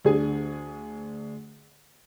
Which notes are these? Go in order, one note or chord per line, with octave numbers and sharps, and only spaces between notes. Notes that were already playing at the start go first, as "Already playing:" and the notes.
D2 D4 G#4 G#5